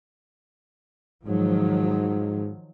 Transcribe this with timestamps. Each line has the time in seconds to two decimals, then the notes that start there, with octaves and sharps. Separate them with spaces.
1.26 G#2 D#3 F3 F#3